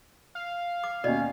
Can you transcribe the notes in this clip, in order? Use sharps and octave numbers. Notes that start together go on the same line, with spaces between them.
F5
D6
D#2 B2 C#4 D5 D#5